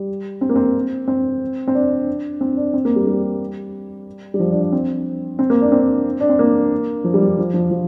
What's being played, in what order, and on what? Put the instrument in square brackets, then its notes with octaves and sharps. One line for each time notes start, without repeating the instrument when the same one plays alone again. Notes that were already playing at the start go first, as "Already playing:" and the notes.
Already playing: [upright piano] G3
C4
A#3
C4
C4
C4
D4
C4
D4
C4
A#3
G3
G3
G3
F3
D4
D4
C4
C4
A#3
D4
C4
D4
C4
A#3
F3
G3
F3
F3
F3
F3